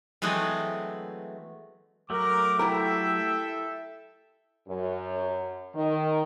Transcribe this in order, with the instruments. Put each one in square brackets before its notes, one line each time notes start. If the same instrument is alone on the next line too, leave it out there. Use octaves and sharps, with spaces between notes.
[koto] E3 F#3 G#3 A3 B3 C4
[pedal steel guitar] F#3 A3 [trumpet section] A#4 [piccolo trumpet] D6
[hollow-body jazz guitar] E4 G4 A#4 [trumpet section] A4 E5 [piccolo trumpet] G5
[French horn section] F#2
D#3